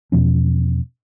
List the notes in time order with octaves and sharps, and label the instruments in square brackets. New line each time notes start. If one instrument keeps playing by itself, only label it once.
[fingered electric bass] E2 B2 F3 C#4